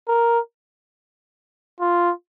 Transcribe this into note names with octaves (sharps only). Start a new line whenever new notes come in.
A#4
F4